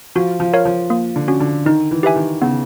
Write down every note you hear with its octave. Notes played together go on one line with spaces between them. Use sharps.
F3 F#4
F3
A#4 C#5 F5
F3
A#3
D3
C#4 F#4
D3
D#3 D#4
E3
G4 B4 E5 G#5
D#3
C#3 B3